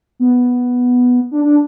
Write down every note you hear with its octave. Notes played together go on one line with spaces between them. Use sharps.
B3
D4
D4